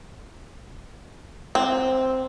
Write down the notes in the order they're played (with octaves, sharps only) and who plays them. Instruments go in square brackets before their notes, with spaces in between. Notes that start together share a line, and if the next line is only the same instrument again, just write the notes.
[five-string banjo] C4